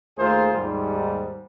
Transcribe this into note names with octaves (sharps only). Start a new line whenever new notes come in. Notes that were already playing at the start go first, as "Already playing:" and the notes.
D#2 A3 F4 G#4 A#4 C5
D#2 G#2 G3